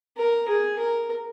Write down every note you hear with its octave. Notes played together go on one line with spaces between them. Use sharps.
A#4
G#4
A#4